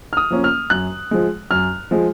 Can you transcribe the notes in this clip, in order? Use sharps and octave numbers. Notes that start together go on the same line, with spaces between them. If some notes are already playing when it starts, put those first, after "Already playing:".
F6
D#6
F3 A#3 C#4
F6
F#2 F#6
F3 G#3
F#2 F6
F3 G#3